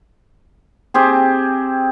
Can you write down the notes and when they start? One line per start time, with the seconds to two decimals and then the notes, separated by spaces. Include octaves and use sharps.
0.94 C4 G4 G#4